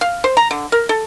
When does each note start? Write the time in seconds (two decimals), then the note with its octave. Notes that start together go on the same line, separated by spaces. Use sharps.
0.01 F5
0.24 C5
0.37 A#5
0.51 D3
0.72 A#4
0.89 A4